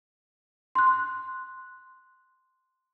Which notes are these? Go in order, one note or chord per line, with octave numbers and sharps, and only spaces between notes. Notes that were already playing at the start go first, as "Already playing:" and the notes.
C6 F#6